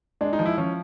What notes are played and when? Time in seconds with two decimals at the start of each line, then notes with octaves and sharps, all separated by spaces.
0.21 G#3 D4
0.33 D#4
0.39 F3
0.46 E4
0.58 F3 C#4